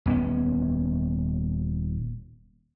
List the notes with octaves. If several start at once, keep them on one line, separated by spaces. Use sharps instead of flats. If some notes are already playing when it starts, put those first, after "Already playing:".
D#1 B3 C#4